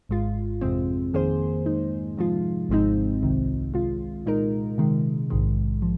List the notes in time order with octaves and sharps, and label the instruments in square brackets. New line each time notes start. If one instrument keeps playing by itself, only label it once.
[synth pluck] G#1 G#2 G#3 F4
F2 C3 G#3 C4
F2 D#3 A#3 G#4 C5
G#2 G#3 D#4
C3 F3 G#3 F4
G#1 G#2 G#3 C4 D#4
C2 C3 D#3
C3 G#3 F4
A#2 G#3 D#4 A#4
C3 D#3 G#3
A#1 G#2 D#3 G#3
F3